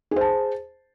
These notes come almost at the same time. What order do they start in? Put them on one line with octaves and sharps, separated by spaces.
G#4 C5 A5